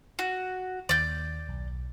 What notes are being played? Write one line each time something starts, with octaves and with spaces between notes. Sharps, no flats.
F#4
D#2 D5 G6
B1